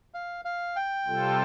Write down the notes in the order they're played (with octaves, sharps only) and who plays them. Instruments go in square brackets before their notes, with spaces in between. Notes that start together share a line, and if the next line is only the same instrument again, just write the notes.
[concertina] F5
F5
G5
[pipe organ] C3 G3 C4 F4 A4